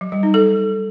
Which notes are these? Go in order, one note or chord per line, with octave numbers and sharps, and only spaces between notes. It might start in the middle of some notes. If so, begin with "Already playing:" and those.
F#3
G3
D#4
A4